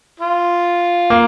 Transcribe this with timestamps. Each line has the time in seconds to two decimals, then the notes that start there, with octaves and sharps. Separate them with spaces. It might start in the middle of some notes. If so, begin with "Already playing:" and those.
0.20 F4
1.10 A#3